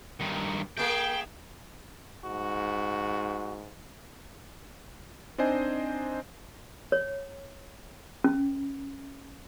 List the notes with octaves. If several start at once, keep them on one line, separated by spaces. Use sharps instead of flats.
G2 D#3
A3 A#3 G#4 G5
G#2 F#4
C4 D4 D#4 C5 D#5 G#5
C#5
C#4